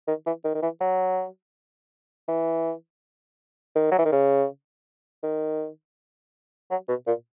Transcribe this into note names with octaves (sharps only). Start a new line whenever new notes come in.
D#3
E3
D#3
D#3
E3
F#3
E3
D#3
F#3
E3
D#3
C#3
D#3
F#3
B2
A#2